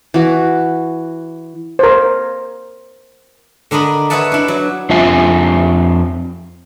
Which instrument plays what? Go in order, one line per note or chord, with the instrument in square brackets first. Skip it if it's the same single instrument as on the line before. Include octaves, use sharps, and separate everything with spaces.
[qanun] E3 F#4
[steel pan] A#4 C5
[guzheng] D3 D4 A#4 D#5 B5
B4 C#5 D#5 E5 F#5 A5
D4 E4
F#3
[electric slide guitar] F2 C4 D4 F4 E5 G#5